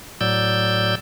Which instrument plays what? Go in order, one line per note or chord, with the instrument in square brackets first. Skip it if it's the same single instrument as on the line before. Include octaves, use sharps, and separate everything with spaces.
[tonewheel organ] A2 F#3 D5 E6 G6